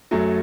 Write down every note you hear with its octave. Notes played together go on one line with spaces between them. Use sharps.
F#2 F#3 A3